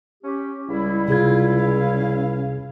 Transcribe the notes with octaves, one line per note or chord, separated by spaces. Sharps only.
C#4 G4
C#2 G3 E4
C3 F4 G#4 G#6
C#4 F5